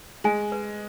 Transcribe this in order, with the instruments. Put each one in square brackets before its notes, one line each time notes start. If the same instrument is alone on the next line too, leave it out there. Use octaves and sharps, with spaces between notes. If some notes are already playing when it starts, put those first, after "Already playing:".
[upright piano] G#3 [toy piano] G#5
[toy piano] B4